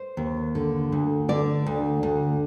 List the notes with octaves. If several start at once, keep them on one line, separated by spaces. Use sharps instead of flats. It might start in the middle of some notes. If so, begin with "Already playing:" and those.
Already playing: C5
D#2
D3
D2
D3 D5
D2
D2